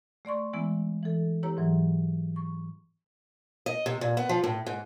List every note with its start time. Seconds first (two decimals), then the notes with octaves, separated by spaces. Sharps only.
0.25 A3 D5 C6 C#6
0.53 E3 G#3 B3 E4
1.03 E3 A4
1.43 B3 E4 G4 B4 C#5 A#5
1.57 G#2 E3 F#3
2.36 C#6
3.66 D#5
3.86 C3
4.01 A#2
4.17 B3
4.29 F3
4.44 A2
4.66 G#2